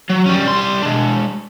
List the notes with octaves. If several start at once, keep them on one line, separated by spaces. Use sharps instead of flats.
F#3
G3 C#4
G3 C6
G#3 D4